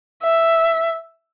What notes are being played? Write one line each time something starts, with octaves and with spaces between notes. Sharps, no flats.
E5